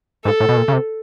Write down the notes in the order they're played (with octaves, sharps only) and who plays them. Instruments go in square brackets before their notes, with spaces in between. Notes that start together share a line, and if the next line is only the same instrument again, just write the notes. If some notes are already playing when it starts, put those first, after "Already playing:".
[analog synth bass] G#2 [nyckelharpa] A4
[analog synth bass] A2
B2
A#2
C#3
C3